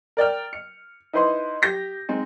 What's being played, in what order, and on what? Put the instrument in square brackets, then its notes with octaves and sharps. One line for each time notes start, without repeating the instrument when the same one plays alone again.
[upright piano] A#4 D5 G5 F6
C#7
D#4 E4 B4 C5 D#5 C6
G4 G6 A#6 B6
G#3 C4 D#4